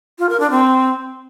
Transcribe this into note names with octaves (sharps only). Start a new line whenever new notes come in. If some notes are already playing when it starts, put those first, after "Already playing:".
F4
A#4
D4
C4